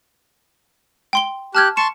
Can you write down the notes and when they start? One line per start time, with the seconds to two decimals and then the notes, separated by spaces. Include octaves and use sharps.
1.13 G5 C6 G7
1.55 G4 A5 F6 F#6 G#6
1.77 A5 C6 C#6 C#7 E7